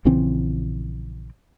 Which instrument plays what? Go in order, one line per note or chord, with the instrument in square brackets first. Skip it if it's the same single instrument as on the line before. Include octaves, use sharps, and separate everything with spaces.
[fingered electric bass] A#1 C#3 E3 C4